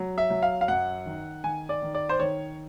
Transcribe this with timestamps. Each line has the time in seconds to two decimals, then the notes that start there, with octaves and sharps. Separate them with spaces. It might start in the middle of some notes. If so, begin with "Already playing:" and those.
Already playing: F#3
0.18 E5
0.30 F#3
0.43 F5
0.61 F5
0.68 F#2 F#5
1.06 D#3
1.44 D#3 G#5
1.69 D5
1.82 D#3
1.95 D5
2.09 C5
2.20 D#3 C#5